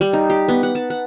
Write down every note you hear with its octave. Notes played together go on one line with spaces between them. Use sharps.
G3
D#4
G4
B3
F#5
A5
F#5